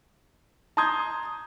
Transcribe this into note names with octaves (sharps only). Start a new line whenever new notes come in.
A5 A#5 C6 D#6 G6 G#6